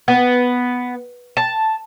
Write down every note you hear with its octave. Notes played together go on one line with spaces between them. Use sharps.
B3
A5